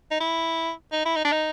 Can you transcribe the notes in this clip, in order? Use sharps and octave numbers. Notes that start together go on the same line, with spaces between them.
D#4
E4
D#4
E4
D#4
D4
D#4